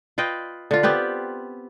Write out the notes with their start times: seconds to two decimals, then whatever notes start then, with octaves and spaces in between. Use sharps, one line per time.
0.18 F4 B4 D#5 G5
0.71 D3 F4
0.83 B3 C4 G4 B4